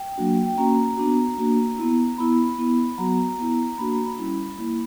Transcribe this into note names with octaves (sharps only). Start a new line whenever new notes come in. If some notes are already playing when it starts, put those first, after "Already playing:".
Already playing: G5
F#3 A#3 D4 F#4
G5
A#3 C#4 F#4 A#5
B3 D4 F#4
A#3 D4 F#4
B3 E4
B3 E4 B5
B3 E4
F#3 B3 F#4 A#5
B3 E4
A#3 D4 F#4 B5
A#5
B5
G3 C#4 E4
A#3 E4